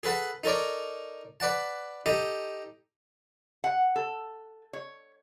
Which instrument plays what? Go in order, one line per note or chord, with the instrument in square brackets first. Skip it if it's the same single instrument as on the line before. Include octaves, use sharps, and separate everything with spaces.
[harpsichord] G#4 A4 B4 F#5 A5
D#4 A4 A#4 C#5 D5
B4 D5 F#5 A5
D#4 G4 A4 D#5
[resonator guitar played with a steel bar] F#5
A4
C#5